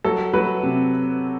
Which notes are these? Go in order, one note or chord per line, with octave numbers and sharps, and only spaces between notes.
F#3 A4
F#3 B4
C3